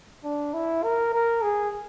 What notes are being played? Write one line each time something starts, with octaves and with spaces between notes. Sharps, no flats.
D4
E4
A#4
A#4
G#4